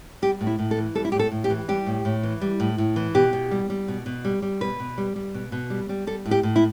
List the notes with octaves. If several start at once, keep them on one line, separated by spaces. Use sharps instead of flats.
G3 G4
A2
E4
A2
A4
E3
G3 A4
E4
A2 G4
A4
A2
G4
E3
G3 G4
A2
A2
E3
G3
A2
A2
E3
B2 G4
B2
G3
G3
B2
B2
G3
G3
B2 B4
B2
G3
G3
B2
B2
G3
G3
G3 A4
A2
G4
A2
E4